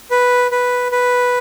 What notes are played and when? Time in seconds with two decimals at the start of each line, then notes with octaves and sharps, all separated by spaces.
0.11 B4
0.51 B4
0.92 B4